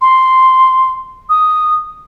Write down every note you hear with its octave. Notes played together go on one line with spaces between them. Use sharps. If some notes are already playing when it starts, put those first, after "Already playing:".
C6
D#6